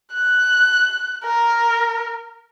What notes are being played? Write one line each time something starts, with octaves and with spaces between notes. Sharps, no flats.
F#6
A#4